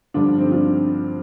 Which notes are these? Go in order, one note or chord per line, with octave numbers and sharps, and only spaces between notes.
G2 D3 F3 D4 F4
C4 D#4
D4 F4